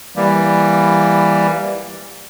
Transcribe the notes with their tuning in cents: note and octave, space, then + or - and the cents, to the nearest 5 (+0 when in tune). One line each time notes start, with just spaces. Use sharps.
E3 +0 G3 +10 A#3 +15